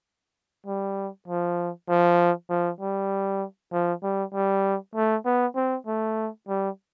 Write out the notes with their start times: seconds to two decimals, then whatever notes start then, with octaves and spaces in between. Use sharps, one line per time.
0.66 G3
1.28 F3
1.89 F3
2.49 F3
2.80 G3
3.72 F3
4.03 G3
4.34 G3
4.95 A3
5.25 B3
5.56 C4
5.87 A3
6.48 G3